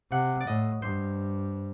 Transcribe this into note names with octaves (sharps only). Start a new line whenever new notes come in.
C3 F#5
D5
A2 D#5
G2 C5